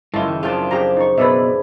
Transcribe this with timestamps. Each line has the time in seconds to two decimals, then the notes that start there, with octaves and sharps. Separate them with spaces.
0.14 F#1 G#3 C#4 E4 F4 A5
0.28 D#3
0.43 C3 D#3 F3 D4 F4 G#4 A5
0.71 G4 G#4 A#5
0.97 D#4 C#6
1.18 B2 D4 G#4 B4 D5 E5